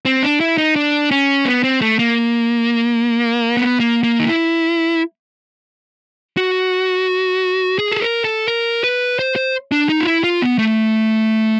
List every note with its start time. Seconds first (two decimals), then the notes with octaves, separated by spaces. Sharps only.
0.05 C4
0.23 D4
0.40 E4
0.58 D#4
0.76 D4
1.11 C#4
1.45 B3
1.64 C4
1.81 A3
1.99 A#3
3.57 B3
3.80 A#3
4.03 A#3
4.19 D#4
4.26 E4
6.37 F#4
7.79 G#4
7.92 A4
8.01 A#4
8.24 A4
8.48 A#4
8.84 B4
9.19 C5
9.36 C5
9.72 D4
9.89 D#4
10.00 F4
10.07 E4
10.24 F4
10.42 B3
10.58 A3